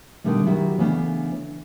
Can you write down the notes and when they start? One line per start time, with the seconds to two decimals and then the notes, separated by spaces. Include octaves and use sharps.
0.24 B2 D3 D#3 G3 A3
0.46 D#3 F#3 E4 F#4 G4 B4
0.78 C#3 E3 A3 B3 C4 D4